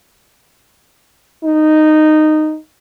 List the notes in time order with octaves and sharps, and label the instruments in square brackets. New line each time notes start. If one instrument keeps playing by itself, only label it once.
[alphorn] D#4